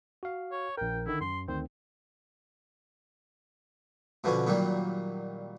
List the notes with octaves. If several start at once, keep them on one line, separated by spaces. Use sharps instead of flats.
F#4 F5
C#5
A#1 A#4 G5
D3 D#3 E4
F#2 C6
D2 D#3 C4 C5
B2 D3 F3 B3 C#4
A#2 D#3 F#3 G3